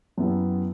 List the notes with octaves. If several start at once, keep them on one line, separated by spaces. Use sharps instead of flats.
F#2 F#3 B3 E4 G4